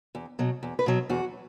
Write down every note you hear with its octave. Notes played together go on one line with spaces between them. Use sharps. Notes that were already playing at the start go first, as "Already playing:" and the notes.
E2
B2 F#3
E2
B4
B2 F#3
E2 F#4